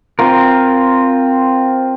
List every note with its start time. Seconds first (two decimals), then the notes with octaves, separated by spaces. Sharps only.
0.19 C4 F4 A#4